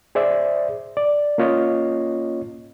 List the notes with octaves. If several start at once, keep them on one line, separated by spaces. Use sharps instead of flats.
G#4 C5 D5 E5
D5
A#3 C#4 F4 C#5 D#5